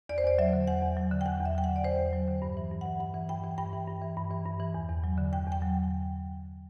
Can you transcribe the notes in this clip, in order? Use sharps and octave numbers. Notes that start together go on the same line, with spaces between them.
E2 D5
C5
E2 D5
F#3 E5
D3
E2 F#5
E2
F#3
D3
G5
E2 F#5
E2
E5
F#3 G5
F#5
D3
D5
E2 C5
E2
F#3
D3
G2
E3
G2
E3 F#5
G2 F#5
E3
G2 G5
E3
G2 G5
E3
G2
E3
G2
E3
G2
E3
E2
E2
F#3
D3
E2 G5
E2 G5
F#3